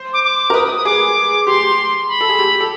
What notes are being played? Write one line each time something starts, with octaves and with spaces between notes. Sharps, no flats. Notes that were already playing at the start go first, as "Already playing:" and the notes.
Already playing: C5
D6
D6
A#4
B4 D#6
D#6
D#6
G#4 D6
G4 C6
B5
A4
G#4
G4
A4